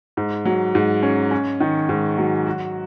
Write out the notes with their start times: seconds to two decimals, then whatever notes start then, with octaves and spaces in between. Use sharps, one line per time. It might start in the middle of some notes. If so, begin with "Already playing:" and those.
0.17 G#2
0.45 F#3
0.75 G#2
1.03 C#4
1.31 C#4
1.60 D#3
1.89 G#2
2.18 F#3
2.47 F#4